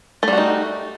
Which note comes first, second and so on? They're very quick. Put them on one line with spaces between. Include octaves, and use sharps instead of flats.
A3 G3 F#4 D#4